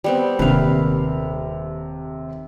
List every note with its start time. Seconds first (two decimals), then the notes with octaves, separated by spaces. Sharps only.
0.04 G3 B3 C4
0.39 D#1 D#2 C3 B4 F5